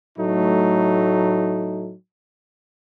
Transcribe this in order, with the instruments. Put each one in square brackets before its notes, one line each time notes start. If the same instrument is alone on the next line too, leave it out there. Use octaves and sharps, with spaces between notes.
[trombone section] A2 F#3 A3 D#4